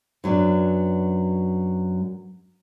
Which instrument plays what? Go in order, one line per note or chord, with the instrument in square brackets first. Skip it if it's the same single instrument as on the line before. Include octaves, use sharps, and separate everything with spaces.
[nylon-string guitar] F#2 F#3 B3 D4